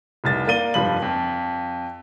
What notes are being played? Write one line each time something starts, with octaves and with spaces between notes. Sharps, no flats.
F1 C2 A6
A#3 D5 D#7 G7
F1 G2 F3 B5 F#7
F2